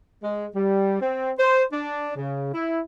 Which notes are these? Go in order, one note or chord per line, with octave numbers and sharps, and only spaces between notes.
G#3
G3
C4
C5
D4
C#3
E4